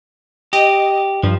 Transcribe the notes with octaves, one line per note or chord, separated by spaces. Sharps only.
G4 D#5
G2 F3